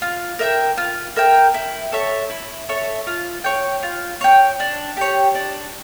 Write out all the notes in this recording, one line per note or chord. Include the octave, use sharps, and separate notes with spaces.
F4
A#4 E5 G5
F4
A#4 E5 G5
E4
A4 C#5 E5
E4
A4 C#5 E5
F4
C#5 G5
F4
C#5 G5
D4
G4 C#5
D4